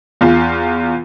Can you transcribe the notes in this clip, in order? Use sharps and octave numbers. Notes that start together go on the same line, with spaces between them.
E2 F4